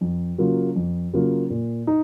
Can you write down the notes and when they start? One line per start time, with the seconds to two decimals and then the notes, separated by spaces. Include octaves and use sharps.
0.01 F2
0.38 C#3 F#3 A#3 F4
0.76 F2
1.13 C#3 F#3 A#3 F4
1.50 A#2
1.87 D#4